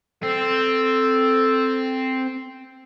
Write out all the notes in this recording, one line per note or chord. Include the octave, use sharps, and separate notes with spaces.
C4 A4